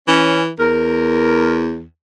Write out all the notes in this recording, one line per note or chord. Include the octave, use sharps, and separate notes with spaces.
E3 C#4
E2 A#4